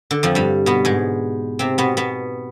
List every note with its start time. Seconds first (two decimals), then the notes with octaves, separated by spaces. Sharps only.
0.11 D3
0.23 F2 F3
0.35 G2 G3
0.66 B2 B3
0.85 G#2 G#3
1.59 C3 C4
1.78 B2 B3
1.97 B2 B3